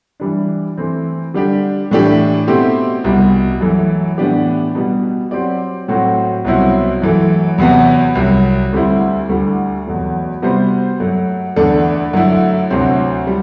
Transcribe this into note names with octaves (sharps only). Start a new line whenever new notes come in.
E3 G3 D4
E3 A3 C4
D3 G3 D4 G4
A2 E3 A3 D4 G4
B2 A3 C4 E4 G4
C2 B2 G3
F#2 E3 A3
A2 E3 B3 D4 G4
B2 G3 B3
F#3 C4 G4 D5
A2 F#3 A3 C4 F#4
C2 B2 F#3 C4 E4
F#2 E3 A3
E2 C3 F#3 B3
C2 C3 F#3
D2 D3 G3 C4 E4
D2 D3 G3
E2 B2 F#3 A3
C3 G3 B3 F#4 C5
F#2 F#3 A3
E2 D3 A3 D4 A4
F#2 D3 A3 E4
D2 C3 F#3 C4
G3